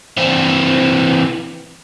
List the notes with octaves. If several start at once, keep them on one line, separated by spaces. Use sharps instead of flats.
E3 C4